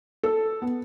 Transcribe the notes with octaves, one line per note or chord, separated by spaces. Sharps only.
A4
B3